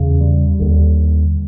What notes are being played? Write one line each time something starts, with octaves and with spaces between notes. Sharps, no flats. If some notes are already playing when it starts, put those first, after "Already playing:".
Already playing: E2 C#3
G3
D#2 D3